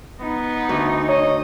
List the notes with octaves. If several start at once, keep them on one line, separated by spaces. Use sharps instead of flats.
B3 D#4
D2
C#5 D#5